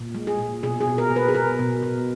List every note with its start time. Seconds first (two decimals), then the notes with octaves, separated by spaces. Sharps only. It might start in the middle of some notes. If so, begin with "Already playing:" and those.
Already playing: A#2
0.15 G#3
0.27 G#4
0.39 A#2
0.63 B2 G#4
0.81 G#4
0.87 B2
0.98 A#4
1.10 B2
1.16 B4
1.28 G#4
1.35 B2 A#4
1.59 B2
1.83 B2